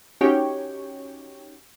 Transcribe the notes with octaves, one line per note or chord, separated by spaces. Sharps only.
C#4 D#4 F#4 G4 C#5 G5